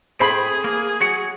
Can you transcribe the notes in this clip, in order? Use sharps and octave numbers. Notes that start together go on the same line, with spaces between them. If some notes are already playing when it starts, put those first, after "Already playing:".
A2 A3 C4 G#4 C5 B5
A#3
F#3 F#4 F#5